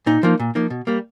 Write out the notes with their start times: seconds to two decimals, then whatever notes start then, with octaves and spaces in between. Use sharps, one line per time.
0.06 A#2 D#4
0.23 F3 A#3 D#4
0.40 A#2
0.55 F3 A#3 D#4
0.70 B2
0.87 G3 A#3